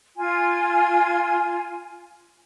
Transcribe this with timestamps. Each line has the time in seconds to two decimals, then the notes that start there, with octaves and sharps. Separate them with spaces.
0.16 F4 G#5